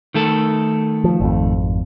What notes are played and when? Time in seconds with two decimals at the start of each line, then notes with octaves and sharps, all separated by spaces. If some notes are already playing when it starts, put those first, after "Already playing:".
0.14 D#3 A3 A4
1.04 F3
1.20 G#1 F2